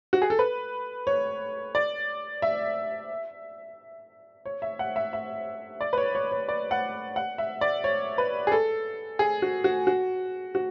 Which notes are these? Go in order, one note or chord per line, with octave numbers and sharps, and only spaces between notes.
F#4
G#4
A4
B4
C#5
D5
E5
C#5
E5
F#5
E5
E5
D5
B4
C#5
C#5
C#5
D5
F#5
F#5
E5
D5
C#5
B4
G#4
A4
G#4
F#4
F#4
F#4
F#4